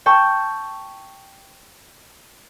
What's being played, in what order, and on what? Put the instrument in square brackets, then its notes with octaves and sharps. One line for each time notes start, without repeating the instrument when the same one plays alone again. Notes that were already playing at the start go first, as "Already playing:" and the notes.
[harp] G5 A5 C#6 E6